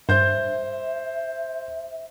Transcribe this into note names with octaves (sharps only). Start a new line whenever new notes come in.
G2 C5 E5 G6